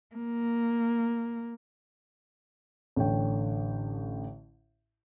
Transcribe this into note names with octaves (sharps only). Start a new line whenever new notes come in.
A#3
A1 D3 C#5 G5